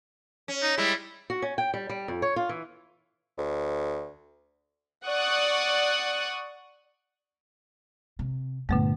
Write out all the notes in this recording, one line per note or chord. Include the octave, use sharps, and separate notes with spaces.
C#4
D#4
G3 G#3 E4
F#4
C#4
G5
G3
G3
F2
C#5
F4
E3
D2
D5 F#5 C#6 D#6 F#6
C3
G2 A#2 D3 A3 B3